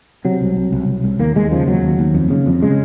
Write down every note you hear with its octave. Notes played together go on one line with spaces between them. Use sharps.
C3 F#3
C2
C2
C2
C2
C2
D#2 A#3
D#2 G#3
C#3 F3
D#2 F#3
D#2
D#2
F2
C#3
F2
C#3 G#3